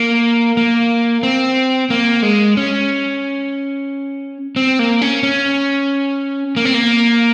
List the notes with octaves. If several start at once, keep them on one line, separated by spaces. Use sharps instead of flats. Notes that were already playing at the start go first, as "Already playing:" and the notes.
Already playing: A#3
A#3
C4
A#3
G#3
C#4
C4
A#3
C#4
C#4
A#3
C4
A#3